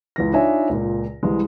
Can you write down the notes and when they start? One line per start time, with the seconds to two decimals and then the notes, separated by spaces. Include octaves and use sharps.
0.16 C#2 E3 A#6
0.33 D4 D#4 F4 C#5 E5 G#5
0.69 C#2 A#2
1.23 C2 E3 G#3